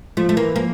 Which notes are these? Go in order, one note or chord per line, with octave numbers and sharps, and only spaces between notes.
F3 A3
A3
E3 A#3
F3 A#3